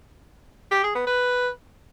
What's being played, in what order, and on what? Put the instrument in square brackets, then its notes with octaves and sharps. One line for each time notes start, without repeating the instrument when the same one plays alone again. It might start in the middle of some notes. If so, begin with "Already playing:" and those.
[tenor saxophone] G4
G#4
B3
B4